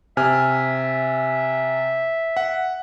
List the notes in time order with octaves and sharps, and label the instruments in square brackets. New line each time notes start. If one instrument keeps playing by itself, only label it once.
[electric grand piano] C3 G#5 F6 [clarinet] E5
[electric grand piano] F#5